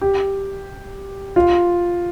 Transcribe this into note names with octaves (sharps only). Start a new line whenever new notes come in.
G4
F4